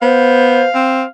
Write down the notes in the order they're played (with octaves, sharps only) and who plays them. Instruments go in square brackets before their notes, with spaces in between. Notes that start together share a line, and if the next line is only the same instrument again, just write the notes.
[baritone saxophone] B3 [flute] C5 [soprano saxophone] F5
[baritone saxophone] C4